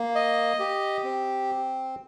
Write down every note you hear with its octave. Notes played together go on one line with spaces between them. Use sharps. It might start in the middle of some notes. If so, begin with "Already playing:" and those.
Already playing: A#3
D#5
G4
C4